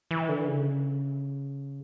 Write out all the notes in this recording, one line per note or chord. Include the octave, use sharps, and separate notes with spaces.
E3
D3
C#3